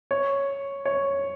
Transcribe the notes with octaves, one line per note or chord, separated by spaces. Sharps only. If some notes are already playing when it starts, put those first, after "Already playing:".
C#5
C#5